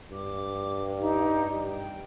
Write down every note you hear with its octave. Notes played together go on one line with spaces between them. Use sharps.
G2 D6
D#4 G4
G5